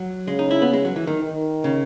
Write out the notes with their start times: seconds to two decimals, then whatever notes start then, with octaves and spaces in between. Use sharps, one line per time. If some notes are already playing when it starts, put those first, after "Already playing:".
Already playing: F#3
0.28 C#3 G#3
0.39 D#4
0.51 E4
0.62 B3
0.73 G#3
0.85 F#3
0.96 E3
1.07 D#3
1.19 D#3
1.64 C#3